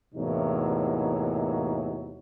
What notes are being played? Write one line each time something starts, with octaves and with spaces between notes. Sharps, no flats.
E2 A2 C3 F#3 A#3 D#4